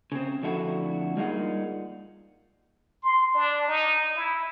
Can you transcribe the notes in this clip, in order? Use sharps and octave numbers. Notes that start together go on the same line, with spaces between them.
C#3 C4
F2 D3 A3 E4 F#4
G3 A#3 D#4 F4 G#4 F#5
C6
D4
D#4
E4